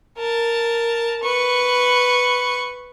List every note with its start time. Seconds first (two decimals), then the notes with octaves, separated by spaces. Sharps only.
0.18 A#4 A5
1.23 B4 C#6